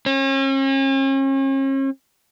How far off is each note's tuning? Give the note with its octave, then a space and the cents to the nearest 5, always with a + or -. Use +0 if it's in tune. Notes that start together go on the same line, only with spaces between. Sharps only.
C#4 -40